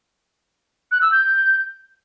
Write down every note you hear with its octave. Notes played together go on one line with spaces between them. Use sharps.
F#6
E6
G6